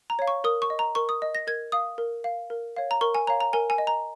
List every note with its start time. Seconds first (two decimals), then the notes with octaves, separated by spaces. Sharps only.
0.10 A#5
0.19 C#5 F5
0.27 C#6
0.44 A#4 D#6
0.62 C#6
0.70 D#5
0.79 A#5
0.95 A#4 C#6
1.09 D#6
1.22 D#5
1.35 A#6
1.47 A#4 G#6
1.72 F5 D#6
1.98 A#4
2.24 F5
2.50 A#4
2.77 C#5 F5
2.91 A#5
3.01 A#4 C#6
3.15 G#5
3.27 C#5 F5 A#5
3.41 A#5
3.53 A#4 G#5
3.70 G#5
3.78 D#5
3.87 A#5